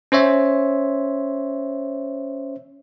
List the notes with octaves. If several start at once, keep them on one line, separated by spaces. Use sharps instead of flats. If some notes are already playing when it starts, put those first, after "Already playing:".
C#4 C5 C#5 E5